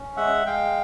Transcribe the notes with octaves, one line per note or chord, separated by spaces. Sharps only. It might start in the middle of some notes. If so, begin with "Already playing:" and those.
Already playing: C#4
G#3 E5 F#5
G#3 F5 G5